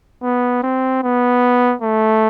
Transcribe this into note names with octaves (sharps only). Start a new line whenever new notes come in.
B3
C4
B3
A3